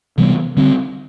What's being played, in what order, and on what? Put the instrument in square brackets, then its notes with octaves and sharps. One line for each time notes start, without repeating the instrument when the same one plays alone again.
[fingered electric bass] C3 E3 G3 B3
D3 G3 C4